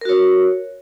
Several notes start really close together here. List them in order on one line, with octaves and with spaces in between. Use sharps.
A#4 F#4 C#5